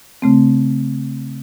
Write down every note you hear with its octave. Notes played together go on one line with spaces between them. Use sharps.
C#3 A3 C4